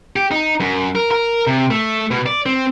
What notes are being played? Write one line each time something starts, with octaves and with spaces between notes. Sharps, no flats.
G4
D#4
F#2
A#4
A#4
C3
A3
B2
D5
C4